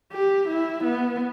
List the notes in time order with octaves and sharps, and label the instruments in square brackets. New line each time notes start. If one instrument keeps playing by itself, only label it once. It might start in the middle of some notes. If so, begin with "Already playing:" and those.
[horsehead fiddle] G4
E4
B3